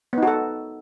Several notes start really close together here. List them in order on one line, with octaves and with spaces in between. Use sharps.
B3 D#4 F#4 A4